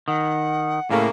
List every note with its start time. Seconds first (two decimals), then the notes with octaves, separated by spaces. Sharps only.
0.08 D#3 F#5
0.90 A2 C#3 A3 A#3